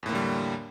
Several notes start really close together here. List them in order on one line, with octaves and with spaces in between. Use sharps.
E2 A2 A#3 D3 G3